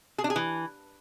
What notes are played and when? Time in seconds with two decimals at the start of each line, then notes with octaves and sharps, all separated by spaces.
0.18 G#4
0.24 D4
0.30 G#4
0.36 E3